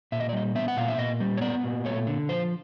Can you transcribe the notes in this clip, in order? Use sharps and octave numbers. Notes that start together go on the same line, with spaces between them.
A#2 E5
D#5
D5
G3 D#5
B3 E5
F#5
A#2 F5
E5
A#2 D#5
G3
C#5
B3 D5
A#2
A3 C#5
D3
F3 C5